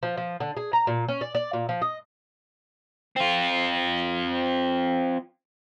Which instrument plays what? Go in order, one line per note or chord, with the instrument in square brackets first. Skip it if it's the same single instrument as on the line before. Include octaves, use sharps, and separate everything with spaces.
[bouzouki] F3
F3
D3
G#4
A#5
A#2
C#4
D5
D5
A#2
F3
D#5
[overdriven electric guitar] C4 F4